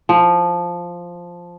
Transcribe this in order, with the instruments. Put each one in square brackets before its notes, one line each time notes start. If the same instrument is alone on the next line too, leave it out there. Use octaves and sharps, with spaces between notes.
[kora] F3